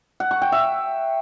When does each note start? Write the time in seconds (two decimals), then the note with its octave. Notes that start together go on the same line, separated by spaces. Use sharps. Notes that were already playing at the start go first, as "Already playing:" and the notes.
0.20 F#5
0.31 C#6
0.42 G5
0.52 E5